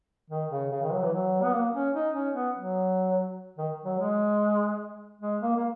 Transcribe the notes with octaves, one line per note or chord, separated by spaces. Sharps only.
D#3
C#3
C#3
D#3
F#3
E3
F#3
B3
A#3
C#4
D#4
C#4
B3
F#3
D#3
F#3
G#3
G#3
A#3
A#3